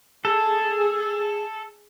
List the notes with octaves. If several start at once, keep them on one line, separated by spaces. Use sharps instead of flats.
G#4 A4